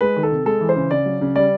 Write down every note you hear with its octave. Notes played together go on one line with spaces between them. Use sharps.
G#3 B4
D#3
A4
C3
G#3 A4
E3
C5
C#3
C#3 D5
F#3
C#3
G3 D5